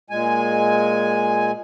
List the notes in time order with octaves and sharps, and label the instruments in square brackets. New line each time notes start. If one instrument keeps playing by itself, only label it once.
[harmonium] A#2 G#3 G#5